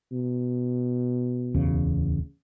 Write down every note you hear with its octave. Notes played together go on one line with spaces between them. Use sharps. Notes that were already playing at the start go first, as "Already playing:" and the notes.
B2
D1 E2 C#3